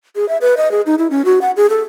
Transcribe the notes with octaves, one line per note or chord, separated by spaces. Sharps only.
G#4
E5
B4
D#5
G#4
D#4
E4
C#4
F#4
F#5
G#4
A4